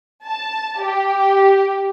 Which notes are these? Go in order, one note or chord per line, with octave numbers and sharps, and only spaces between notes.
A5
G4